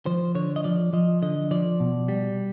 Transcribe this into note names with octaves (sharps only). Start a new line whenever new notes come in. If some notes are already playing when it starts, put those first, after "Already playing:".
F3 C5
D3 C#5
D#5
F3 D5
F3 D#5
D3 D#5
F3 D5
B2
G3